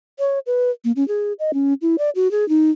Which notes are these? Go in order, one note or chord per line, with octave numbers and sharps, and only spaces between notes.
C#5
B4
A#3
C#4
G#4
D#5
C#4
E4
D5
F#4
G#4
D#4